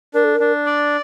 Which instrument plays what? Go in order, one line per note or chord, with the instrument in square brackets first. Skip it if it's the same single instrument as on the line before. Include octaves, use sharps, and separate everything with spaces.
[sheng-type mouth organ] D4 [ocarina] A#4
[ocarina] A4
A#4
[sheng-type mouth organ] D4
D5